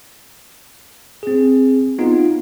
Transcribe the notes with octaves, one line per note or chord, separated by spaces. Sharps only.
C4 G#4
B3 D#4 F4